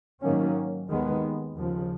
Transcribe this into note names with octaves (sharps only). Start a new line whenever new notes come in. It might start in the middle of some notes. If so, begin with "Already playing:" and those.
G#2 D#3 F#3 A#3 C#4
D#2 D#3 G#3 B3
D#2 C#3 F3